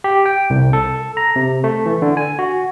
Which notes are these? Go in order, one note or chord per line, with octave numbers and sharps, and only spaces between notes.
G4
G5
C2
A4
A#5
C3
A3
E3
D3
G#5
F#4